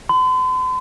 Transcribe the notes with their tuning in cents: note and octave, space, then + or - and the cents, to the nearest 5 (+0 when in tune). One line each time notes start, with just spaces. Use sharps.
C6 -45